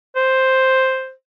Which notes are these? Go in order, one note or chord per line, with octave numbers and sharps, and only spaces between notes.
C5